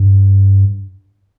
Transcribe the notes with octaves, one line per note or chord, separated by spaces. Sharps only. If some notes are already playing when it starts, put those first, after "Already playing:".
Already playing: G2